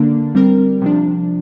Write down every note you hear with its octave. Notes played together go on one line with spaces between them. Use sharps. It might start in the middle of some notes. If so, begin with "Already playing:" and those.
Already playing: D3 A#3 D4
G3 C4 A#4
C3 F3 D4